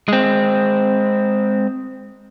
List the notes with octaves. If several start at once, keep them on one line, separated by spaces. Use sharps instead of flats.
G#3 C4